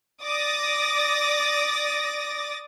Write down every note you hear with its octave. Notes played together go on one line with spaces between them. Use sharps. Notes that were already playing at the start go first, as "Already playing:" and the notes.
D5 D6 D#6 A6 A#6